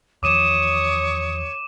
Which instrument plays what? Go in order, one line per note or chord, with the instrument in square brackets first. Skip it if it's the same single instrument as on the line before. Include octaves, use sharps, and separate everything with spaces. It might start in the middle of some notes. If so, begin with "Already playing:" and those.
[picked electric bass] E2 D#3 F3 [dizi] C#5 [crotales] D6 D#7 E7 [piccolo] D#6